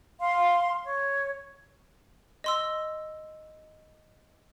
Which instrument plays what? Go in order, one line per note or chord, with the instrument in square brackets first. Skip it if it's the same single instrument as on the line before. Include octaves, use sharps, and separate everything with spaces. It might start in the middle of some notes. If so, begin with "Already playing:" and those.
[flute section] F5 C6
C#5
[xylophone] D#5 C6 E6